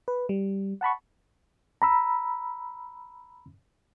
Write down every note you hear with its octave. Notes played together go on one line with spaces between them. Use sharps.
B4
G3
F#5 A5 B5 C#6
A#5 B5 E6